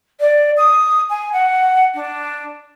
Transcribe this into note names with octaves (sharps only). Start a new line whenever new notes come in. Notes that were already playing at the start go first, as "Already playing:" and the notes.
D5
D#6
G#5
F#5
D4